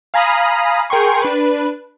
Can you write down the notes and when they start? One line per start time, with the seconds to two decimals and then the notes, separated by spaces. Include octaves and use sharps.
0.14 F5 G#5 A#5 B5 D#6
0.90 G#4 A#4 G5 G#5 C6 C#6
1.22 D4 B4